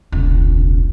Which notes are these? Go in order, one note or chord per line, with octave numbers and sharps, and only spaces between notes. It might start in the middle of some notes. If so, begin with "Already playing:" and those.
E1 C#2